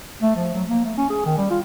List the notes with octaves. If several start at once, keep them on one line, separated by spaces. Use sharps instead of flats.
A3
F3
F#3
A#3
A3
C#4
G#4
D#3
G3
F4